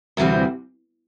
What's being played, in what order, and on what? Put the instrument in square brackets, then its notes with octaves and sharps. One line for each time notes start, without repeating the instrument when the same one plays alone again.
[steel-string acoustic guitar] D2 C3 E3 G3 C4